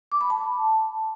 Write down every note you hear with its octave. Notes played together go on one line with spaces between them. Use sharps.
D6
B5
A5